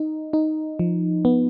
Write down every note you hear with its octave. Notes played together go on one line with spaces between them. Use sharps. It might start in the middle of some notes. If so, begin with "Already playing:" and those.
Already playing: D#4
D#4
F3
B3